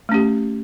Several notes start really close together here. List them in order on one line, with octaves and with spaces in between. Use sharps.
A3 C#4 G4